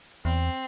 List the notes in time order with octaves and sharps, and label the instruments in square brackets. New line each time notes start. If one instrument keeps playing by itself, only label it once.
[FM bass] E2 [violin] C4